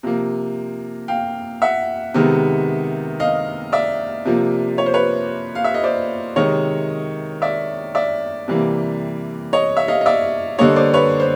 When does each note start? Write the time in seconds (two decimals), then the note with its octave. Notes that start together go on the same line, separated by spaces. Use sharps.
0.03 C3 F3 A#3
1.08 F5 G5
1.62 E5 F#5
2.14 C3 D#3 G#3 B3
3.20 D#5 F5
3.73 D5 E5
4.25 C3 F3 A#3
4.78 C#5
4.86 C5
4.94 B4 C#5
5.55 F5
5.64 E5
5.74 D#5
5.84 C5 D5
6.36 C3 D#3 G#3 C#5 D#5
7.42 D5 E5
7.95 D5 E5
8.48 C3 E3 G3 A#3
9.53 C#5 D#5
9.77 E5
9.88 D#5 F5
10.01 D#5
10.06 D5 E5
10.58 D3 G3 A#3 C#5 D#5
10.76 C5 D5
10.94 B4 C#5
11.20 C5